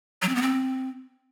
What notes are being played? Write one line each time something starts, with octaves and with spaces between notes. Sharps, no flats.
F#3
C4
B3
C4